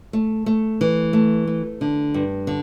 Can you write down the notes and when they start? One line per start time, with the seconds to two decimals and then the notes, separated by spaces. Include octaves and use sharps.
0.13 A3
0.46 A3
0.81 E3
1.13 A3
1.47 A3
1.81 D3
2.14 G2
2.47 D3